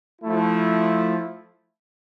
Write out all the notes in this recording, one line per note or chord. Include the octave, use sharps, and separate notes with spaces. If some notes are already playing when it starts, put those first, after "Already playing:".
F3 A3 E4